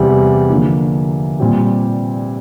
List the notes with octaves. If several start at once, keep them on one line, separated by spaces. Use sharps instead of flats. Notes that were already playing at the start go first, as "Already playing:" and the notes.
Already playing: E2 C3 G3
D3 F3 A#3 D4
A#2 G3 C4 G4